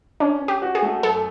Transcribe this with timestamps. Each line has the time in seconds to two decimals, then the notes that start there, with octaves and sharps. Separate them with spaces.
0.20 C#4 D4
0.41 C#4
0.48 G4
0.62 F#4
0.75 G#4
0.82 A3
1.03 F#2 A4